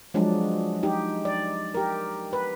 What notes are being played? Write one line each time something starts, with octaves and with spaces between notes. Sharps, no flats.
F3 F#3 G#3 D4
D#4 G4
D5
G4 A#4
B4